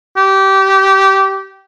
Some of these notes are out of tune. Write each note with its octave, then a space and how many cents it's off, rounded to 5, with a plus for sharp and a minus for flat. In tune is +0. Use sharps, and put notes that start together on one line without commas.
G4 -20